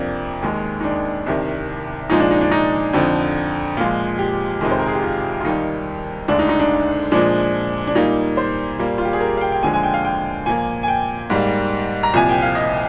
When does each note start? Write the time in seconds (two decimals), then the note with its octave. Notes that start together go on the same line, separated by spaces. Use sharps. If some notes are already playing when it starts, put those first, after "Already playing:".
Already playing: F2 C3 F3 A#3 D4
0.42 D#2 D#3 G#3
0.81 D#4
0.84 D4
1.26 C2 C3 D#3
2.10 A#2 F3 G#3 D#4
2.20 D4
2.31 D#4
2.41 D4
2.51 D#4
2.93 F2 D3 F3
3.77 A#2 F3 G#3 F4
4.19 G4
4.61 F2 C3 D#3 G#3
4.71 C5
4.79 A#4
4.87 G#4
4.95 G4
5.03 F4
5.41 F4
5.45 D#2 D#3 G3 A#3 D#4
6.28 D2 D3 G#3 D4
6.39 D#4
6.49 D#4
6.60 D4
7.12 A#2 F3 G#3 D4
7.87 D4
7.95 A#2 G3 A#3 D#4
8.37 C5
8.79 A#2 G3 A#3
8.98 F4
9.05 G4
9.13 G#4
9.21 A#4
9.37 F5
9.41 G5
9.52 G5
9.62 D#2 D3 F3 G#3 G#5
9.74 G#5
9.83 G5
9.94 F5
10.05 G5
10.46 A#2 F3 A#3 G#5
10.83 G#5
10.88 G5
11.30 G#2 G3 A#3
12.03 A#5
12.13 C2 A#2 F3 G#5
12.29 G5
12.42 F5
12.55 D#5